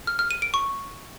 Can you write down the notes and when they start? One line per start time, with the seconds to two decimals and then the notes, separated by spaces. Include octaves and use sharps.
0.07 F6
0.19 F6
0.31 D#7
0.42 D7
0.54 C#6